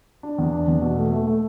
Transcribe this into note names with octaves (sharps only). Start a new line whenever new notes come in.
D4
E2
D4
E2
B2
A3
A3
A3